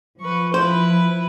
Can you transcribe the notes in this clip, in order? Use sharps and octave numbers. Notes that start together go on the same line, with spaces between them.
F3 B4 C#6
E4 B4 C5